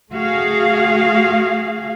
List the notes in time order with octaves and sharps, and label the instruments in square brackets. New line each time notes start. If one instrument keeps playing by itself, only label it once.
[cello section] A3 F#4 G#4 F5